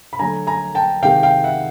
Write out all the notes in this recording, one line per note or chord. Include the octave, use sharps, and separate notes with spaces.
B5
D3 F#3 A3 G#5 A#5
G#5 A#5
G5 A5
C3 D#3 G#3 F5 G5
F5 G5
E5 F#5